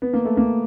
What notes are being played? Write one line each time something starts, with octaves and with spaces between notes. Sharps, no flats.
B3
A#3
A3
A#3